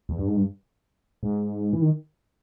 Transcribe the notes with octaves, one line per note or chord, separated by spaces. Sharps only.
E2
G2
G#2
G2
G#2
E3
D#3